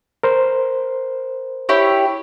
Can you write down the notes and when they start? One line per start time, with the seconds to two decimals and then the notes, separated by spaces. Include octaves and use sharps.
0.23 A#4 C5
1.69 E4 G4 C#5